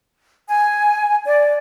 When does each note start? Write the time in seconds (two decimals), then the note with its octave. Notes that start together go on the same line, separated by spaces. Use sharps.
0.48 G#5
1.25 D5